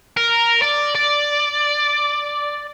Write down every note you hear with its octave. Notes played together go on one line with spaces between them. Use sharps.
A#4
D5
D5